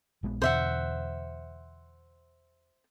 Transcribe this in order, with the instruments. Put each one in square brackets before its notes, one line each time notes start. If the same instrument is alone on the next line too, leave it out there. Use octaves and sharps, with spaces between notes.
[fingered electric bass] A#1 G#3 B3
[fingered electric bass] E2 B2 D3 [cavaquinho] C5 E5 F#5